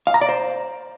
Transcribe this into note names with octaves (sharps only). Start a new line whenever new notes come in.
F5
A#5
D5
C5